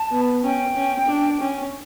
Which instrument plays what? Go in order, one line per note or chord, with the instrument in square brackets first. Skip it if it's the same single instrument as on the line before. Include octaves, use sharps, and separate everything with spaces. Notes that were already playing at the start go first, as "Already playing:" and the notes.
Already playing: [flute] A5
[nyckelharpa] B3
[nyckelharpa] C#4 [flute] G5
[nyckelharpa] C#4
D4
C#4